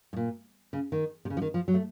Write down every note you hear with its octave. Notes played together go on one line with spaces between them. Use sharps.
A2
A#2
C#3
D#3
C3
C#3
F3
D#3
F3
F#3
A3